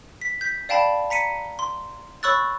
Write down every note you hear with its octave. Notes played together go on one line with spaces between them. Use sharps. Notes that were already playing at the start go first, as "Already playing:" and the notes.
B6
G6 B6
D5 F5 G5 A5 B5
A#5 B6 C#7 D#7
C6
C#5 B5 C#6 E6 F#6 A6